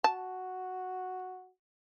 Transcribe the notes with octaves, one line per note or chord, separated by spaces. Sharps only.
F#4 A5